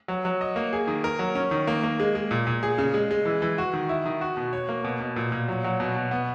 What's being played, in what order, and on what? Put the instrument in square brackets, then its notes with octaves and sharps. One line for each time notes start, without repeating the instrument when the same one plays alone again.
[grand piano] F#3
F#3
D#5
A#3
G#4
D#3
A#4
F#3
C#4
D#3
A#3
A#3
G#3
G#3
A#2
A#2
G#4
C#3
G#3
G#3
E3
E3
F#4
D#3
E4
D#3
F#4
B2
C#5
A#3
B2
B2
A#2
A#2
F#3
F#3
B2
B2
B3